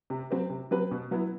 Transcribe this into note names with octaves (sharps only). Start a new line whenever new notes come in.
C3
F#3 C4 G4 B4
C3
F#3 C4 G4 B4
B2
F#3 B3 E4